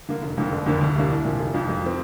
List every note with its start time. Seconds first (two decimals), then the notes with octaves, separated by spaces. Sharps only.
0.09 D3 A#3
0.22 F1
0.38 F2 D3 A#3
0.52 G1
0.66 F2 D3 A#3
0.81 D2
0.95 C3 A#3 D4
1.10 C2
1.24 A#2 F3
1.39 F1
1.54 F2 F3 D4
1.69 F2
1.83 F3 C4